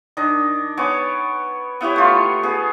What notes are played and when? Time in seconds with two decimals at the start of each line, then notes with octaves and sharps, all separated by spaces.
0.17 D#3 D4 D#5
0.77 B3 C#5 G#5 D6
1.81 B3 E4 G4 C#5
1.96 A3 F4
2.43 B3 G#4